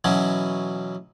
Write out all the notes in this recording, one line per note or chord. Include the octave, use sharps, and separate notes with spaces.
B2 E3 F#3 C#4